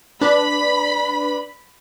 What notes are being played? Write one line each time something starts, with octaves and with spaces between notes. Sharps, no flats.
D4 B4 B5